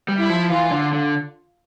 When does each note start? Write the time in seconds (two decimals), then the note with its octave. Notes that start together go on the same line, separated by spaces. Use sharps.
0.08 G3
0.19 E4
0.30 F3
0.50 E3 F4
0.71 D3
0.93 D3